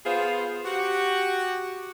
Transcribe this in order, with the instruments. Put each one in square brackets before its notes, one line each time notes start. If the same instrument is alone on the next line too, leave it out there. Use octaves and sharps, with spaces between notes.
[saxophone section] B3 F4 G#4 C5
F#4 G4